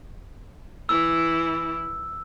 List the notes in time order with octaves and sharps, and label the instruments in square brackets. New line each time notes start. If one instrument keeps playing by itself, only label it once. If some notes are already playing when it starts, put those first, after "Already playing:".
[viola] E3 E4 [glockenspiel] E6